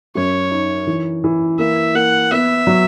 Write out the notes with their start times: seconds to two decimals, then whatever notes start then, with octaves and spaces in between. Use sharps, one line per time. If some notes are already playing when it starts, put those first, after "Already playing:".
0.15 F#2 C#5
0.51 D#4
0.87 E3
1.24 E3
1.59 A#3 E5
1.95 A#3 F#5
2.31 B3 E5
2.67 F#3